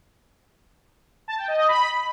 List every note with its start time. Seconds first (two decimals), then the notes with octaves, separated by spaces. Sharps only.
1.28 A5
1.38 G5
1.48 D#5
1.58 D#5
1.68 B5